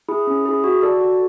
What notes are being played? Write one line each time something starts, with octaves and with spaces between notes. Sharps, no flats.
E4 G#4
C#4
E4 G#4
F#4
A4 D5
F#4